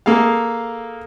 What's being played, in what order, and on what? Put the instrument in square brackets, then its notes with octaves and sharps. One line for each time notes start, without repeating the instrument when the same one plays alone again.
[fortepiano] A#3 G#4 A4 F5